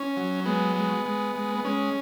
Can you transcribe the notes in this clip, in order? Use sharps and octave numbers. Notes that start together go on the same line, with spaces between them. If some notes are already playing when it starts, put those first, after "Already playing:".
Already playing: C#4
F#3
G#3 B3
G#3
G#3
G#3
B3
G#3 C#4